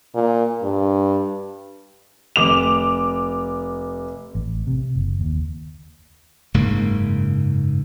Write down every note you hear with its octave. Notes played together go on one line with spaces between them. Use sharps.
A#2
G2
F1 D6 F7
A1
C3
F#1
D#2
F#1 G#2 C#3 A#3